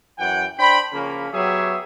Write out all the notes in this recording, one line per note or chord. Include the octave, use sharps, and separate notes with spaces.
F#2 E3 F#5 G5
D4 C5 G5 B5
C#3 F3 A#3 C#4
F#3 B3 G4 G#4 C#5 E5